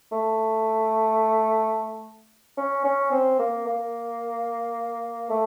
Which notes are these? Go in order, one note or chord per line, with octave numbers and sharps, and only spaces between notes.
A3
C#4
C#4
C4
A#3
A#3
A3